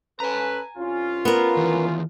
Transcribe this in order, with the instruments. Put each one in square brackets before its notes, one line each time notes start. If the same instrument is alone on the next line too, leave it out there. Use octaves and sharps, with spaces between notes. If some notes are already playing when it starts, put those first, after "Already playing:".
[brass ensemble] C#4 A4 B4 [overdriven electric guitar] G#5 A#5
[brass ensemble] C2 C#4 F4
[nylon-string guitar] B3 A#4
[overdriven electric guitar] D#2 E3